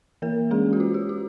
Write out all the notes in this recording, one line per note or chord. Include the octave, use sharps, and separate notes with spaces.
E3 A#3 A#4
G#3 C#4 G#4
F#4
F4
G4
F4